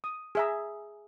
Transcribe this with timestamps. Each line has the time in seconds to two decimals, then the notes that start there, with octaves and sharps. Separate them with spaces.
0.04 D#6
0.35 G#4 E5 A#5